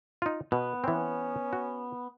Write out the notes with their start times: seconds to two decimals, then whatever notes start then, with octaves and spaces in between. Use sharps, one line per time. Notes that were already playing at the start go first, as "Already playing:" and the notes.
0.22 D#4 F4
0.52 B2 B3
0.84 E3 C4 C#4
1.53 F#4